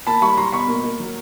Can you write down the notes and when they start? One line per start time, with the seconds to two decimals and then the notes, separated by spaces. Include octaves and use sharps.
0.07 A#3 A5 B5
0.22 G3 B5 C#6
0.37 G3 A#5 C6
0.52 B2 B5 C#6
0.68 A#3
0.84 A#3
1.00 F#3